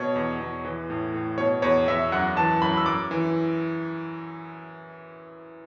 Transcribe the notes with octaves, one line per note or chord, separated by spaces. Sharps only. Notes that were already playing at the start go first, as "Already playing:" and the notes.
Already playing: B2 C#5
E2
E2
E3
A2
A2
B2 C#5
E2 C#5
E2 E5
F#2 F#5
E3 A5
F#2 B5
E6
F#2 D6
E3